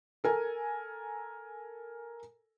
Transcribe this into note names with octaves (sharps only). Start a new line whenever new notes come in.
A4 A#4 G#5